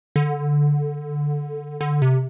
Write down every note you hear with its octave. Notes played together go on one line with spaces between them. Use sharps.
D3
D3
C3